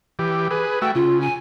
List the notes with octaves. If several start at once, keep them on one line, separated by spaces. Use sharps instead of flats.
E3 G4
G#4 B4
A3 F#4 E5 G5
C#3 F4
G#5